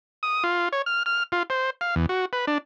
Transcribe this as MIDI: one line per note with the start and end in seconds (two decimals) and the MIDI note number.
0.23 0.44 87
0.44 0.69 65
0.73 0.82 73
0.86 1.03 89
1.06 1.23 89
1.32 1.43 65
1.50 1.70 72
1.81 1.95 77
1.96 2.06 40
2.09 2.25 66
2.33 2.45 71
2.47 2.58 62